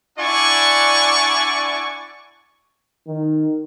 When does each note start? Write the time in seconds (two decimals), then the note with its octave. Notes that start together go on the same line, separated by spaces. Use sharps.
0.18 D4 E4 D5 F#5 G#5 C#6
3.07 D#3